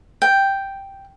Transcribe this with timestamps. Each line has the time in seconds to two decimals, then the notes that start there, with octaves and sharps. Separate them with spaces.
0.22 G5